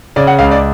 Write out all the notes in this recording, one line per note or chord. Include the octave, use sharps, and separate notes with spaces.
C#3 D5
F#5
C#2 F5
D5